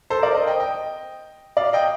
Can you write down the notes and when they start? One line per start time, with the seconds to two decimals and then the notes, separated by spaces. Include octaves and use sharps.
0.10 A4 C5
0.23 A#4 D5
0.34 C5 D#5
0.47 D#5 G5
0.60 D#5 G5
1.57 D5 F5
1.73 D#5 G5